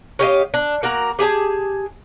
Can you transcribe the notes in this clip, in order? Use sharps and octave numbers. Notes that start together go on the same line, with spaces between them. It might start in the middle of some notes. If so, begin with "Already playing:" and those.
C#4 G4 D#5 F5
D4
A#3 F#4 A#4
G4 G#4 G#5 A5